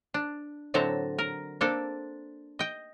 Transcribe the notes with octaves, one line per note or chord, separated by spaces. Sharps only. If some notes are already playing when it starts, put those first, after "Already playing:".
D4
A2 D3 F#3 C4 A5 A#5
A#4
A#3 C4 D4 A4
D#5 G5